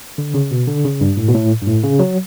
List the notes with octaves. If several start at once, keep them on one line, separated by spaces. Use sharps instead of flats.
D3
C#3
B2
D3
C#3
G2
A2
B2
A2
G2
A2
C#3
F#3